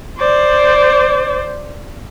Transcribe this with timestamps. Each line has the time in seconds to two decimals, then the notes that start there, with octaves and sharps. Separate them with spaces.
0.18 C5 D5